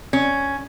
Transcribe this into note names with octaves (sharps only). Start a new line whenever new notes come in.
C#4